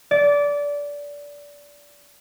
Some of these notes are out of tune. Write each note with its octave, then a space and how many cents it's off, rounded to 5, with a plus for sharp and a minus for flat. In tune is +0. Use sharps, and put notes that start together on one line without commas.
D5 -20